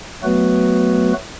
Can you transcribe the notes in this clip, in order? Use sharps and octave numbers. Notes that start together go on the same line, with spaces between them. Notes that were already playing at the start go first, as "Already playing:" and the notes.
F#3 A3 B3 F#4 B4